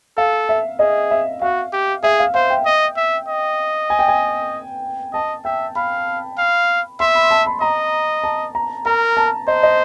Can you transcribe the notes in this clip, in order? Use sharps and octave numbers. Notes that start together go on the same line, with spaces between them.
A4 F5
E5
G#4 D#5
E5
F#4 F5
G4
G#4 E5
F5
C5 F5
G5
D#5
E5
D#5
G#5
G5
G#5
D#5 A5
E5 G5
F5 B5
F5
E5 C6
B5
A5
B5
D#5 A#5
A5
A#5
A#4 A#5
A5
C5 D#5
D#5